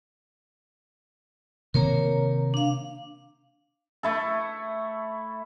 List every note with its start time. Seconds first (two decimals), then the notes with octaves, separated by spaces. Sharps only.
1.74 C3 D#3 A#3 A#4 C#5 A#5
2.54 D4 F5
4.03 A3 E4 A4